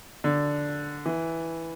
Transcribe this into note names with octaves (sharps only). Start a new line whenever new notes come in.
D3
E3